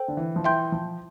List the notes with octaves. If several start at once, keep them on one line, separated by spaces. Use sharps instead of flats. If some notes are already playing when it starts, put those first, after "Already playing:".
Already playing: A4 C5 G5
D3
E3
F3
E3 E5 G5 C6 G6
F3